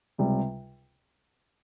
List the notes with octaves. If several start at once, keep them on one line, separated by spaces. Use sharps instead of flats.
C#2 C3 G3